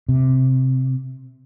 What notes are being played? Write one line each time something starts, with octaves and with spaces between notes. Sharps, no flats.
C3